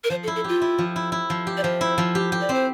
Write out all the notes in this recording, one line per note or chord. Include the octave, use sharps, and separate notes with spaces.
A#4
F3 C5
A4
E4
A4
F4 G4
E4
F3
E4
E4
F3
G4
D5
F3 C5
E4
F3
G4
G4
D5
C4 C5